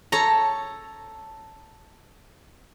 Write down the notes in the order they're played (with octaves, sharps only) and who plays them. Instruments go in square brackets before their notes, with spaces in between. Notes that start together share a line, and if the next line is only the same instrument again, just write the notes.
[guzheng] A4 C#5 A#5